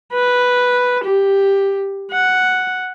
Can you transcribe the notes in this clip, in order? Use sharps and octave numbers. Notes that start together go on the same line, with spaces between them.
B4
G4
F#5